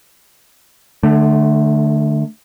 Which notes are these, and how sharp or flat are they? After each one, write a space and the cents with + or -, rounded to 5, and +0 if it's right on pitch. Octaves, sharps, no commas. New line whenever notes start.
D3 +30 A3 -5